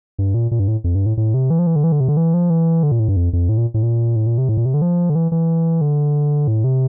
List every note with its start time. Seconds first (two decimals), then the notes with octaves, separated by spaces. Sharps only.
0.19 G2
0.34 A#2
0.51 A#2
0.60 G2
0.68 A2
0.84 F2
0.95 G2
1.06 A2
1.17 A2
1.34 C3
1.50 E3
1.59 F3
1.67 E3
1.76 D3
1.84 E3
1.92 D3
2.00 C3
2.08 D3
2.17 E3
2.34 F3
2.50 E3
2.83 D3
2.92 A#2
2.99 A2
3.08 G2
3.16 F2
3.33 F2
3.49 A2
3.58 A#2
3.74 A2
3.83 A#2
4.16 A2
4.27 A#2
4.38 C3
4.49 A2
4.57 A#2
4.66 C3
4.74 D3
4.82 F3
5.10 D3
5.15 E3
5.32 E3
5.81 D3
6.48 A2
6.64 C3